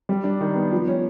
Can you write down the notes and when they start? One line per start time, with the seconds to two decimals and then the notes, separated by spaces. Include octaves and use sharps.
0.09 G3
0.24 D4
0.41 D#3
0.55 B3
0.72 F3
0.88 C#4